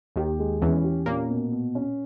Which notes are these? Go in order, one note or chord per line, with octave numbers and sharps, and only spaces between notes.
D#2 D#3 G4
G#3
E2 E3 C#4
G4
A#2 A#3 C#4
B2
B2
C#4